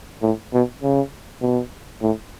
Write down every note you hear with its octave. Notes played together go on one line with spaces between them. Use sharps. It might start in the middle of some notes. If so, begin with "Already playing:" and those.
A2
B2
C#3
B2
A2